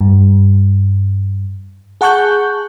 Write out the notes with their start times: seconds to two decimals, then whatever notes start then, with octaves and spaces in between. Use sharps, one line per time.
0.01 G2
2.01 G#4 F#5 A5 C#6 F#6 G6